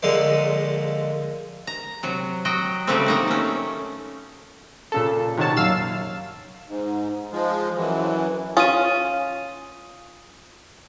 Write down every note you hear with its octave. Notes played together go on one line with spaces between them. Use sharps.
A#1 A#2 D3 G#3 A4 C5
A#5
C3 F#3
F#3 F#4 D#5 G5
C#3 F#3 G3 A3 A#3 C4
A#3 D#4 F#5
A3 C#4
A#2 C#3 A4
C3 D#3 F#4 C#5 A5
F#2 A#2 F5 E6 E7
G#2
F3 G#3
F#2 E3
C#4 F4 D#6 D#7